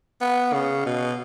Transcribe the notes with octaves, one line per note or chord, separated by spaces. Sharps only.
B3
C#3
B2